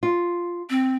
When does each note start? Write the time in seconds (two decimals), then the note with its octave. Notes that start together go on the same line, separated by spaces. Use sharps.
0.03 F4
0.70 C4